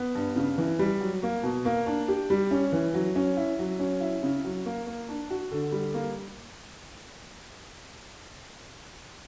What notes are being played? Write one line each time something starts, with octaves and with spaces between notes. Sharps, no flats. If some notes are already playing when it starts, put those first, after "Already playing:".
Already playing: B3
G2
C#3
E3
G3
F#3
A#3
B2
A#3
D4
G4
G3
C#4
E3
F#3
C#4
E4
F#3
C#4
E4
C#3
F#3
A#3
A#3
D4
F#4
D3
G3
A#3